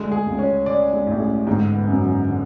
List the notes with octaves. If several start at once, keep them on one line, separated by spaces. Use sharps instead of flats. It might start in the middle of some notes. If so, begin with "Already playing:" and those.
Already playing: D2 D3 G#3
G#4
C#2 C#3
C#4
D5
G#3
A1 A2
G#4
G#2 D3
B3
F#2
F#3
D3